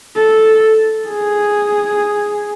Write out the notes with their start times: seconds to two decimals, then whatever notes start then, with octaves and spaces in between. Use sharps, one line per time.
0.16 A4
1.08 G#4